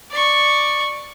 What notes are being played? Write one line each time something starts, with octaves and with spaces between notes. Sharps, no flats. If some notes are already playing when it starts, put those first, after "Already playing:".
D5 C#6